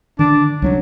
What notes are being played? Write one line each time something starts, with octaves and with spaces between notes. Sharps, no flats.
D3 D#3 D4
C2 F#3 C4 D4